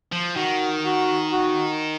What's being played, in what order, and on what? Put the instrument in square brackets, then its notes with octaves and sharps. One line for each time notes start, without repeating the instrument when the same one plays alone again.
[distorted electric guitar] F3
[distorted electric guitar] D#3 [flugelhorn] F#4
[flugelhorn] F#4
F#4